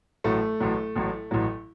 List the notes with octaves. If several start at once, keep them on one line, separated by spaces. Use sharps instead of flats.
A1 A2 F#3 A3
A1 A2 F#3
A1 A2 F#3
A1 A2 F#3